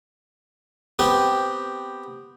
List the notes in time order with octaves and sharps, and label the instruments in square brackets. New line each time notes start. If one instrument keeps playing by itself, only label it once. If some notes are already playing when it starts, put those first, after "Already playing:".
[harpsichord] B3 C4 G4